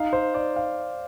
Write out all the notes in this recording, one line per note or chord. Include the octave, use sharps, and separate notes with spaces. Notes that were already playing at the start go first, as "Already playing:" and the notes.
Already playing: D#4 F5
C5
D5
F5